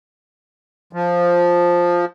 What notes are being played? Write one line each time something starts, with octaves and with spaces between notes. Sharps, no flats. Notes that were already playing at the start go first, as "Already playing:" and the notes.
F3